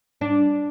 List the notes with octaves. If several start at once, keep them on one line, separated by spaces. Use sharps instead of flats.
D4